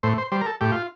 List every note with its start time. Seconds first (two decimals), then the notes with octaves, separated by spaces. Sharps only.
0.03 A2 C5
0.18 C5
0.32 G3 C5
0.41 A#4
0.46 A4
0.61 A2 G4
0.72 F4